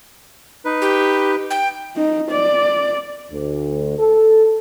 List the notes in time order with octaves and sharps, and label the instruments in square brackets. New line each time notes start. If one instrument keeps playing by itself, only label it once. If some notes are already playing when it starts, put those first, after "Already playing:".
[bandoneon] D#4 B4
[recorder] G4
G5
[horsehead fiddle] D#4
D5
[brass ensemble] D2
A4